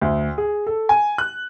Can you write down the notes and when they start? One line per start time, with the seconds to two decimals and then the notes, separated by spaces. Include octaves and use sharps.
0.02 D2
0.38 G#4
0.67 A4
0.89 G#5
1.18 F#6